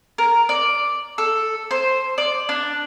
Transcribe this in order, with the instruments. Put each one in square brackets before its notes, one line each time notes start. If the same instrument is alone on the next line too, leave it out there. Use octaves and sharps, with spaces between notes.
[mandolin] A#4
D5
A4
C5
D5
D4